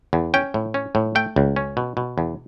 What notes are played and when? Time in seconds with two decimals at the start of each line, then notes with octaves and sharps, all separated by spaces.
0.13 E2
0.34 C#4 G5
0.54 A2
0.74 C#4
0.95 A2
1.15 A3 G5
1.36 C#2
1.56 C#4
1.77 B2
1.97 B2
2.18 E2